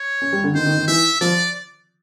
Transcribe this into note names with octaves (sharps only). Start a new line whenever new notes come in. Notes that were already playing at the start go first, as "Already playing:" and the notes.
Already playing: C#5
C#4
G3
D3
D#3 C5
D#3
D#3
E3 E5
F3 D5